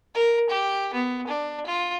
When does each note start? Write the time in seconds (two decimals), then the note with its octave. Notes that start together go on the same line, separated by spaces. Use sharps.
0.15 A#4
0.50 G4
0.94 B3
1.27 D4
1.66 F4